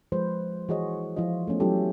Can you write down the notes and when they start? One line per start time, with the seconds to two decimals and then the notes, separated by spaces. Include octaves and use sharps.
0.12 F3 G#3 B4 C5
0.69 E3 F#4 G#4 C5 C#5 D#5
1.17 F3 E4 F4 D#5
1.48 A3 B3 C#4
1.60 F#3 G3 C#4 E4 G4 A4